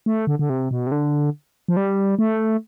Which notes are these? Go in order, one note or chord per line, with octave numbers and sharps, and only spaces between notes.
A3
D3
D3
C3
B2
C3
D3
F3
G3
A3